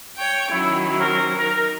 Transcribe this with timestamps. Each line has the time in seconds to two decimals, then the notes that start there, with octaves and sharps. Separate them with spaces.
0.17 C#5 G5
0.52 D#3 F#3 C#4 E4
0.98 C4 F#4 A#4
1.38 D#4 A#4